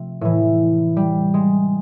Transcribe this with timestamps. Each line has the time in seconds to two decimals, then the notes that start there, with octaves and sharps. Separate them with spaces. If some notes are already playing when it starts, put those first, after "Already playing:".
Already playing: C3 F3 A3
0.21 A2 E3
0.97 G3
1.34 G#3